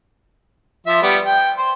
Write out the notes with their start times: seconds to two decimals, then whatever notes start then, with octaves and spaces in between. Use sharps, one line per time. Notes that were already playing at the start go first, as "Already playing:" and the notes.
0.87 F3 E5
1.02 G3 B3
1.25 G5
1.58 C5